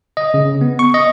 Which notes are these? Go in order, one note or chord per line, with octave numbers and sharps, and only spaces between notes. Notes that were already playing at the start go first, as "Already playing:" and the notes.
D#5
C#3
B3
C#6
D#5